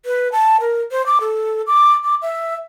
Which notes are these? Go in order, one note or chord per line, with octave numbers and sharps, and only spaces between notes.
B4
A5
A#4
C5
D6
A4
D6
D6
E5